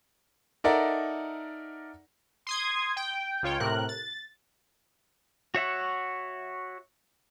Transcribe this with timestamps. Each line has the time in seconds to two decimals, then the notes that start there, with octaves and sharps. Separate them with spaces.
0.64 D#4 A4 A#4 D5 E5 F#5
2.47 C6 D#6 G#6
2.97 G5
3.43 C#2 F4 C#5 G5
3.60 A2 C3 A#4 F#6
3.89 A6
5.55 F#4 C#5 E5 F#5